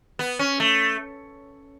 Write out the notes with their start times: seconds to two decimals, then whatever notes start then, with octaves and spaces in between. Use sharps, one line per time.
0.19 B3
0.39 C#4
0.60 A3